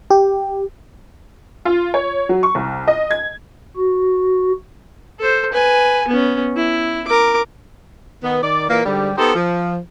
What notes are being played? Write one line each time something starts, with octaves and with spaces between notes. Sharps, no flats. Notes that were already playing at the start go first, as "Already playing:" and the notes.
G4
F4
C#5
F#3
C#6
C2
D#5
G#6
F#4
A4 C5
B4 G#5
B3 C#4
E4
A#4 D6
D#3 B3
D#3 D5
A#2 E3 A#3
G#2 D3 G3
B3 D#4 G4 A4 C5
F3